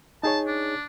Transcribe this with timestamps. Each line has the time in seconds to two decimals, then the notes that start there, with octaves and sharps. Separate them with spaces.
0.23 D#4 G#4 C#5 A5
0.47 D4